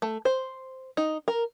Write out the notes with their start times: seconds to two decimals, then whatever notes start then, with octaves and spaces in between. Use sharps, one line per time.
0.02 A3
0.25 C5
0.97 D#4
1.28 A#4